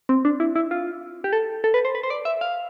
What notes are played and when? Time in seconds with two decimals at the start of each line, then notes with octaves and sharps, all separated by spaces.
0.09 C4
0.25 D4
0.40 E4
0.56 E4
0.71 F4
1.24 G4
1.33 A4
1.64 A4
1.74 B4
1.85 C5
1.95 B4
2.03 C5
2.10 D5
2.25 E5
2.41 F5